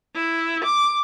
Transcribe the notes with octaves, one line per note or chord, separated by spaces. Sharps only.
E4
D6